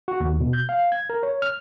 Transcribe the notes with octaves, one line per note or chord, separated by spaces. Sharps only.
F#4
D#2
B2
G6
F5
G#6
A#4
C#5
F6